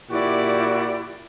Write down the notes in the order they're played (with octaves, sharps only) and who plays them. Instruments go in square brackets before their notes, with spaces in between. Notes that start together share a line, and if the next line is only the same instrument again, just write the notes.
[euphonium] A#2 [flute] E4 [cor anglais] F#4 [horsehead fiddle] G4 D5